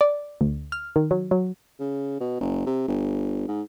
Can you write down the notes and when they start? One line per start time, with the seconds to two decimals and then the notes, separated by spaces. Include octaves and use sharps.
0.01 D5
0.41 D2
0.72 F6
0.96 D#3
1.11 F#3
1.31 F#3
1.79 C#3
2.20 B2
2.40 F#1
2.66 C3
2.87 G1
3.48 G#2